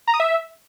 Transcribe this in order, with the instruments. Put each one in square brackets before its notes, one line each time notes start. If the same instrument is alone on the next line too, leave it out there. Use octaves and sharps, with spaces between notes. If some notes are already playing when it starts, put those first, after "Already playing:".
[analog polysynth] A#5
D#6
E5